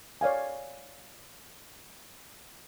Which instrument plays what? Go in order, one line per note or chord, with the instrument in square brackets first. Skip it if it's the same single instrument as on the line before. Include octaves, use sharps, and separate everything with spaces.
[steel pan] C#5 D5 F5 G#5